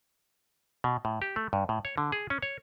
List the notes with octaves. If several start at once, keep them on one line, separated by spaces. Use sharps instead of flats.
B2
A2
G4
A3
G2
A2
C#5
D3
G#4
C#4
C#5